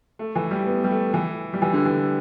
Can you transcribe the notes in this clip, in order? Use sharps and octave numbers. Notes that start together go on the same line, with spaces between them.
A3
E3
G3
B3
G3
A3
E3
G3
E3
D3
E3